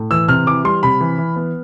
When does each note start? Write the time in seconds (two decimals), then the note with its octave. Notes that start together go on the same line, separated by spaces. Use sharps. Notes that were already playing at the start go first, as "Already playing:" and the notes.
Already playing: A2
0.11 E3 E6
0.28 C3 F6
0.47 E3 D6
0.64 G3 C6
0.83 C3 B5
1.01 E3
1.18 E3
1.36 B3